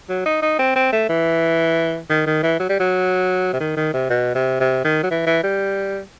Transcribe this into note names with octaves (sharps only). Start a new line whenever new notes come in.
F#3
D#4
D#4
C4
C4
A3
E3
D#3
D#3
E3
F#3
G3
F#3
C3
D#3
D#3
C3
B2
C3
C3
D#3
F#3
E3
E3
G3